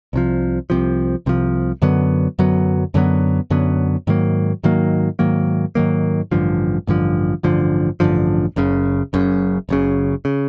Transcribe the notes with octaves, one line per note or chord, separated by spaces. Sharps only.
C2 C3 F3
C2 C3 F3
C2 C3 F3
F#2 D3 F#3 B3
F#2 D3 F#3 B3
F#2 D3 F#3 B3
F#2 D3 F#3 B3
G#2 D#3 F#3 A#3
G#2 D#3 F#3 A#3
G#2 D#3 F#3 A#3
G#2 D#3 F#3 A#3
A1 G2 D3 F3
A1 G2 D3 F3
A1 G2 D3 F3
A1 G2 D3 F3
F#1 F#2 C#3
F#1 F#2 C#3
F#1 F#2 C#3
C#3